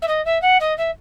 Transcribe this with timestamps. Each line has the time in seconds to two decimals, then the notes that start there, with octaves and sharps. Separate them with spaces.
0.02 E5
0.08 D#5
0.25 E5
0.42 F#5
0.60 D#5
0.78 E5